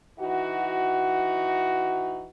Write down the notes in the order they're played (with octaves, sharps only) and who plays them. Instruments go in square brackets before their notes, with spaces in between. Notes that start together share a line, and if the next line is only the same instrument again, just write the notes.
[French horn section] E3 D#4 F#4